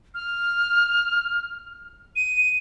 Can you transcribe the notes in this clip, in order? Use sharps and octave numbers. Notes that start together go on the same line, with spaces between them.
F6
D#7